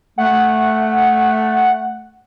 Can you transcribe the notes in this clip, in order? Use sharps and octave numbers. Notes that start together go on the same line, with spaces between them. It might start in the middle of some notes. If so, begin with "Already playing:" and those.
A3 F#5